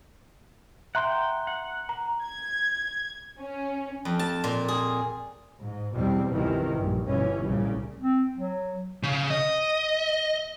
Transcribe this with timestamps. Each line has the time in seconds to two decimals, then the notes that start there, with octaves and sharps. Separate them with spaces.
0.95 E5 F#5 G5 A#5 C6
1.47 F#5
1.89 A#5
2.22 G#6
3.40 C#4
4.05 F2
4.19 A5
4.44 A#2
4.68 G#4
5.60 G#2
5.95 E2 B2 G3 C4
6.33 G1 C#2 C3 D#3 E3
6.75 A#1 G2
7.07 G1 B2 E3 C#4
7.45 C2 A#2 C#3 G3
8.01 C4
8.37 F#3
9.03 C#3
9.30 D#5